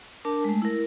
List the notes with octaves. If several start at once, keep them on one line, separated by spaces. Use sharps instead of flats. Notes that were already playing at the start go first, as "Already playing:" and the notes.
D4 A#4 A5
G#3 A3
E4 A#4